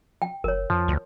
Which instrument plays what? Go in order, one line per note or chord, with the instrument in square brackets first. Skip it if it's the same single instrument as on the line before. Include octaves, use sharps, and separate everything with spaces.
[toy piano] G5
[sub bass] F#1 [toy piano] A#4 C#5
[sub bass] F2 [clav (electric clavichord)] F3
[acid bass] D2